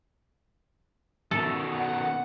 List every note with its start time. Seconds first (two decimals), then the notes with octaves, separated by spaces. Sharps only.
1.31 B2 D#3 A4
1.67 F#5